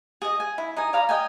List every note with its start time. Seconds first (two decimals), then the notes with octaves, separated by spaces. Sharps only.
0.22 G#4 D#5
0.40 G#5
0.58 E4
0.76 D#4 D#5 G#5
0.93 D5 F5 A#5 B5
1.09 D#5 G5 G#5